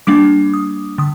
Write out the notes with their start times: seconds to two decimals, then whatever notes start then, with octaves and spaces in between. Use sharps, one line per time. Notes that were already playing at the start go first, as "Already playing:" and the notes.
0.07 G3 A#3 D4 D6
0.54 D#6
0.98 D3 D#6